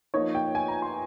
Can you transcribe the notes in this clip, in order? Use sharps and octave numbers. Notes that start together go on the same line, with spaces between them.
F3 A#3 D#4 C#5
G5
G#5
A#5
C6